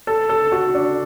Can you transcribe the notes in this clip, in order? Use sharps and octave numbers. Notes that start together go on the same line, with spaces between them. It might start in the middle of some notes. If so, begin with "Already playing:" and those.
A4
A4
F#4
D4